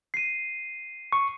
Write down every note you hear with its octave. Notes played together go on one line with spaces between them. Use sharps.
C7 D#7
C#6